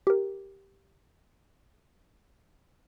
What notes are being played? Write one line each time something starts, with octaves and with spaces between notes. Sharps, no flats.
G4 A#4